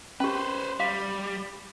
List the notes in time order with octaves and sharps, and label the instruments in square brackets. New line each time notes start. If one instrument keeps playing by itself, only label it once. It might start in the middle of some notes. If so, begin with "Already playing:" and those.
[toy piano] C#4 G4 [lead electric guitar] B4 C5
[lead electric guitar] G3 [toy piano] F5